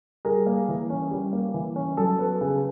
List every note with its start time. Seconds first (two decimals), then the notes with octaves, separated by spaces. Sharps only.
0.25 G3 G#4 A#4
0.47 A#3
0.68 E3
0.90 C#4
1.11 G3
1.33 A#3
1.54 E3
1.76 C#4
1.97 F#3 A4
2.19 B3
2.41 C#3